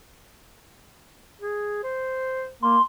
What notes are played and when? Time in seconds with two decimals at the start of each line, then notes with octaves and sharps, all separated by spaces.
1.41 G#4
1.84 C5
2.63 A#3 C6